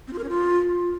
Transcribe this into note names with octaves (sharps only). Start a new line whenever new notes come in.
C4
F4
A#4
C#4
F4